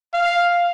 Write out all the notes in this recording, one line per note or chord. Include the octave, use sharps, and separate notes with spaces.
F5